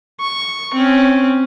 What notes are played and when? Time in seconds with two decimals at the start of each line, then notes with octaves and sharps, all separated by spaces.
0.20 C#6
0.74 C4 C#4